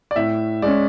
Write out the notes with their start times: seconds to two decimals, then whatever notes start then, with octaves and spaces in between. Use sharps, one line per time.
0.11 D5
0.16 A2 E5
0.62 G#3 C#4 D5